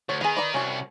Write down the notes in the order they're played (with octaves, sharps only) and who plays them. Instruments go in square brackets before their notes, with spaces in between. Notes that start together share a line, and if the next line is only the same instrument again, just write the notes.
[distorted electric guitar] D2 [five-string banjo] C#5
[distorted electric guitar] D#3 [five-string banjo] B3 G#4
[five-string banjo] B4 D5 A#5
[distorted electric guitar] C2 [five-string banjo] C#4 F#4